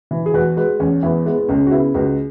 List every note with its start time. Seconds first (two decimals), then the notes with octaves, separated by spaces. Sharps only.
0.11 E3
0.26 G#4
0.34 E2 F#4 B4
0.57 G#3 F#4 B4
0.80 E2 C#4
1.03 E2 B3 E4
1.26 G#3 B3 E4
1.38 B3
1.49 C#2 C#4
1.66 F#4
1.71 C#3 B3 E4
1.94 C#2 F#4 B4